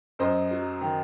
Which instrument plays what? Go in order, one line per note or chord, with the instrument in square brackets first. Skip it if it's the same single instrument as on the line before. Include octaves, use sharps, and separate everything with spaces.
[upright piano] F#2 C5 D#5
F#3
D#3